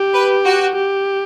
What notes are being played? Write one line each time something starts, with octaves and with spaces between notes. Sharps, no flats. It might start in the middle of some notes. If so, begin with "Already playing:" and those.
Already playing: G4
B4
F#4
G4